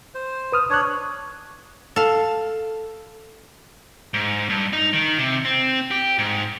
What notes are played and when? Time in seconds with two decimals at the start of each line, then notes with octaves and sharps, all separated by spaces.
0.15 C5
0.52 B4 D#6 F6
0.70 D4 C#5 D#6 F#6
1.96 A4 F5
4.14 G#2
4.49 G2
4.73 D#4
4.93 D#3
5.18 C3
5.45 C4
5.91 G4
6.19 G#2